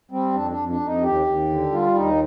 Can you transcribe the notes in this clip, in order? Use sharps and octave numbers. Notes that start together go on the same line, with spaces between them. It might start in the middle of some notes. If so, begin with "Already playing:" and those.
G3 C4
F2 D4
D4
F2
D4
F2
D#4
D#2 G4
D#2
D3
G3 F4
D#2 D#4